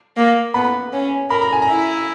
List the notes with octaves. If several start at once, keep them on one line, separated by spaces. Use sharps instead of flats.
A#3
B3 B5
C#4
A#4 B5
A#5
G#5
A#5
E4